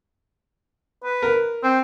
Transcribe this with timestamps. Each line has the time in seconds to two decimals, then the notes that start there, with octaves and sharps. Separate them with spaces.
1.04 B4
1.22 A#4
1.63 C4